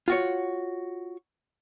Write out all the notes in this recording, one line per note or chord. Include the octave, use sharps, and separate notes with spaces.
F4 F#4 C#5